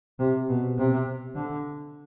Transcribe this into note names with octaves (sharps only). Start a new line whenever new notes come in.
C3
B2
C3
D3